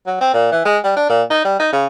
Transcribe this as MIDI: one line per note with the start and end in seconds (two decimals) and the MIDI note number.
0.07 0.18 54
0.21 0.33 60
0.33 0.51 46
0.52 0.64 52
0.65 0.77 56
0.84 0.92 55
0.96 1.09 62
1.09 1.22 46
1.30 1.40 63
1.44 1.55 55
1.59 1.71 63
1.73 1.87 49